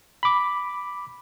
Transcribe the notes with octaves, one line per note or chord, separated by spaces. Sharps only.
B5 D6